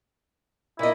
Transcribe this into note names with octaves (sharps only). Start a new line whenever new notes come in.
A#2 E4 D#5